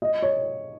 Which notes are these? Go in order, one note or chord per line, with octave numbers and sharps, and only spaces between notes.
D#5
C#5